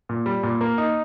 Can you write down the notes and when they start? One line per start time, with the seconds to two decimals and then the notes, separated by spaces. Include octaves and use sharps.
0.09 A#2
0.26 G3
0.43 A#2
0.61 A#3
0.78 D#4